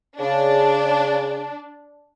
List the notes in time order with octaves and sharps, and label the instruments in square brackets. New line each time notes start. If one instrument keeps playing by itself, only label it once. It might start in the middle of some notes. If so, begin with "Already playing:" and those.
[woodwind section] C#3 [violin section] D4